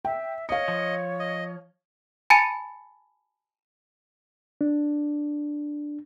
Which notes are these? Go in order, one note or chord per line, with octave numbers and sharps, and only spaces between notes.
E5 G5
C#5 D#5 F5 C#7
F3
D#5
G#5 A5 B5 A6 C#7 D#7
D4